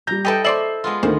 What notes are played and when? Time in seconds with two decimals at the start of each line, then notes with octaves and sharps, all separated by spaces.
0.07 G3 A#5 G6
0.25 E4 G4 A4 B4 D#5 G5
0.44 C5 D5 E5 C7 F#7
0.84 G#3 B3 F4
1.03 D2 D#3 C5